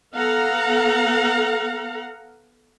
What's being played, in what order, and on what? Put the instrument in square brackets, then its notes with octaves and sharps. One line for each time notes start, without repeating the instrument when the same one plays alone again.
[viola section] B3 A4 F5 F#5 A#5